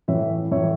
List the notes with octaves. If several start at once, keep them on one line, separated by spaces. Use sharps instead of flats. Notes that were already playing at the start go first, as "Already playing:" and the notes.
A2 E3 C#5 E5
A2 E3 C#5 E5